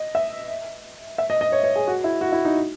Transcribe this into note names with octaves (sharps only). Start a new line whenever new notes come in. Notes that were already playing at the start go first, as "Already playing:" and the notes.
Already playing: D#5
E5
E5
D#5
D#5
C#5
C#5
G#4
F#4
E4
F#4
E4
D#4